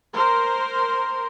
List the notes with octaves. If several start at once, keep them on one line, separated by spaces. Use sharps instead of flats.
A#4 C5